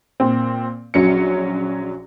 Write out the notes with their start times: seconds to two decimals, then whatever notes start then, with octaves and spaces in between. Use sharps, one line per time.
0.20 A#2 C4
0.94 A#1 F#3 C#4 C#7